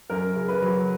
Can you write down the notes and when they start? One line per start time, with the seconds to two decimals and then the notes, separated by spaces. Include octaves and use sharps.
0.10 F#2 A#4
0.36 C#3
0.48 B4
0.62 F#3